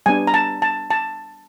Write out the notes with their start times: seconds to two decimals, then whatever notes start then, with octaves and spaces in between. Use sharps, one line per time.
0.06 G3 B3 D4 G#5
0.27 A#5
0.34 A5
0.62 A5
0.90 A5